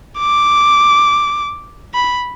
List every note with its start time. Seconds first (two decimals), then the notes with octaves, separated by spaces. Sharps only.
0.19 D6
1.95 B5